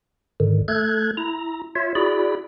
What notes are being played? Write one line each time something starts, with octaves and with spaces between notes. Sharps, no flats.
G#2 D3 D#3
A3 A4 F#6 G#6
E4 A#5
F4 C#5 E5
E4 F#4 G#4 D5 B5